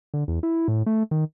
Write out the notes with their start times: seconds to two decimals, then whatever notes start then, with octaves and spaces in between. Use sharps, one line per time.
0.14 D3
0.28 E2
0.43 E4
0.68 A2
0.86 A3
1.11 D#3